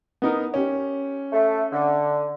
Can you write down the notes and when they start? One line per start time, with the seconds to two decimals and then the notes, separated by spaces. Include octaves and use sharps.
0.22 B3 D#4 A#4
0.54 C#4 G4
1.33 A3
1.72 D3